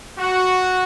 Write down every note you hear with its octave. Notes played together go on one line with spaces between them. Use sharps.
F#4